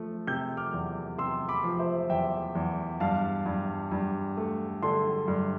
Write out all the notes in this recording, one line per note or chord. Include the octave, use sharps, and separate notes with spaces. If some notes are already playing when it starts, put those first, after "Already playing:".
Already playing: F3 A3
C3 E6 G6
D6 F6
E2
C3 C6 E6
B5 D6
F3
C5 E5
E2 E5 G5
E2
G2 F5 A5
G2
G2
A3
D3 A5 C6
G2